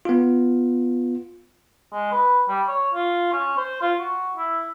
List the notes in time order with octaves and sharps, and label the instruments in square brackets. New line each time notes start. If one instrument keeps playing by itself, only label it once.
[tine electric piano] B3 F4
[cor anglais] G#3
B4
G3
C#5
F4
C#4
C5
F4
F#4
E4